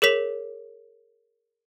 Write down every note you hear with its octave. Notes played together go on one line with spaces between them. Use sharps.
G#4 A#4 C#5 B6 F7